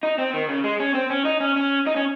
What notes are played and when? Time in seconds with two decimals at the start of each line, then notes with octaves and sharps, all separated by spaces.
0.03 D#4
0.18 C4
0.34 D#3
0.49 C#3
0.64 G#3
0.80 C#4
0.94 C4
1.10 C#4
1.25 D#4
1.40 C#4
1.56 C#4
1.87 D#4
1.96 C#4